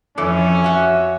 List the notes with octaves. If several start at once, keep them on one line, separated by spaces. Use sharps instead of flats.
F2 E3 C#4 A4
F#4 E5